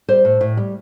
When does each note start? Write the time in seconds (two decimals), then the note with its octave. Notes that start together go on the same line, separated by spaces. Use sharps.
0.08 G3 C5
0.25 A2
0.41 A2
0.57 G3